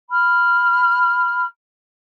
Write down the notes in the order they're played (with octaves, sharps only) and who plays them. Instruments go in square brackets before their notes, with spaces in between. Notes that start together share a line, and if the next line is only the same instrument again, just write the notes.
[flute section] B5 F6